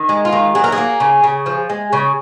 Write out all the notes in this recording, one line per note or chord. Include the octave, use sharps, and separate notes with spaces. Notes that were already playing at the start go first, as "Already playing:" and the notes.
Already playing: D#3
G#3
F4
D#3
F#3 G#4
A#4
G#4
A#3
C#3
C#3
F3
G#3
C#3